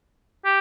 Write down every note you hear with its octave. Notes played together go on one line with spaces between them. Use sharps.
G4